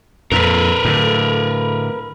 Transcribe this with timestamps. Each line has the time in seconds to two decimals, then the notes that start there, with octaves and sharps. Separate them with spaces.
0.32 F2 A#2 A#4 B4
0.85 A2 D3